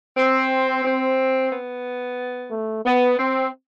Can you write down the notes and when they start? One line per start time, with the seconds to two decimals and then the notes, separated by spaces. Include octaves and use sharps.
0.17 C4
0.84 C4
1.51 B3
2.51 A3
2.84 B3
3.18 C4